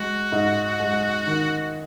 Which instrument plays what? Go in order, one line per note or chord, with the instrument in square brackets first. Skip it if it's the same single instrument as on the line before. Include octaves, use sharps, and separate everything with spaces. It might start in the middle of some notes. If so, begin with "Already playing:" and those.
Already playing: [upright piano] G#3 [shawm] F#4
[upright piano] G#2
G#3
D#3